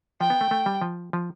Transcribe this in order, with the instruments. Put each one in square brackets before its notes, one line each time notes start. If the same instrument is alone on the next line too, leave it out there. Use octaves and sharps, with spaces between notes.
[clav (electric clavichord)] F3 [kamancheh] G5
[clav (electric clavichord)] B3
A3
A3
G3
F3
F3